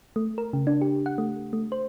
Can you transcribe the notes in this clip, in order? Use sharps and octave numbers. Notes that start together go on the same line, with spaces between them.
A3
A#4
C#3
D4
G4
F#5
A3
A3
C5